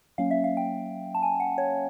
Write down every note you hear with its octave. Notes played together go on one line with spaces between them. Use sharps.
F#3 A#3 C#4 F5
E5
F5
G5
A5
G#5
F#5
C#5